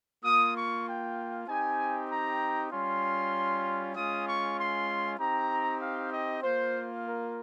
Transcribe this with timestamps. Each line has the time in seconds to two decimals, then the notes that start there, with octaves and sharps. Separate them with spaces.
0.24 A#3 F4 D#6
0.55 C#6
0.86 G5
1.48 C4 D#4 G4 G#5
2.10 A#5
2.71 G3 C#4 F4 C6
3.95 G#3 C#4 F4 D#6
4.26 C#6
4.57 C6
5.19 C4 D#4 G4 A#5
5.81 F5
6.12 D#5
6.42 A#3 F4 C5
7.04 A#4